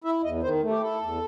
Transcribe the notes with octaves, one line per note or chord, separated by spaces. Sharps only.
E4 E5
E2 D#5
D#3 C5
A3
G4
E4 A4
E2